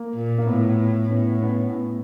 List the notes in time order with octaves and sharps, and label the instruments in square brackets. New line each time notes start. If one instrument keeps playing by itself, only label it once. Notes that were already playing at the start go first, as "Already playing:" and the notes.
Already playing: [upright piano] A#3
[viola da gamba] A#2
[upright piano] A#3
[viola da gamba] A2 [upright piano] B3
[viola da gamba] A2 [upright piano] B3 C#4
[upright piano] B3 C#4